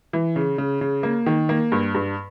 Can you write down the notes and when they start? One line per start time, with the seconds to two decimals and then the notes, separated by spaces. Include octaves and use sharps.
0.13 E3
0.36 C#3
0.58 C#3
0.81 C#3
1.03 A#3
1.26 D#3
1.49 A#3
1.72 G2
1.95 G2